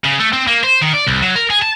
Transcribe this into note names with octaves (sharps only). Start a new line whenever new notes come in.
C#3
A3
C4
A#3
C5
D#3
D5
C2
F#3
A#4
G#4
A5